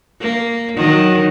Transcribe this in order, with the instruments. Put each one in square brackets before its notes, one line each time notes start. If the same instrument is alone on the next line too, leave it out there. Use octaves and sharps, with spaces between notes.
[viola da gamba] A#3
D#3 F#3